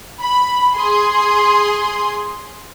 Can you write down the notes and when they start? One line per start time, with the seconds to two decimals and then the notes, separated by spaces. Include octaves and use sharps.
0.21 B5
0.76 G#4 C6